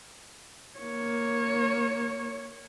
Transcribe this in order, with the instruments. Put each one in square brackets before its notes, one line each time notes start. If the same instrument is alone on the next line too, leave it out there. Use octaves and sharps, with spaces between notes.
[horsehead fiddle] A#3 C#5